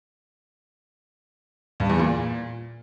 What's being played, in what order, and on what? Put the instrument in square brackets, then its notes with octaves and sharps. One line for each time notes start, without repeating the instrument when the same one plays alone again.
[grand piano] G2
E2
A#2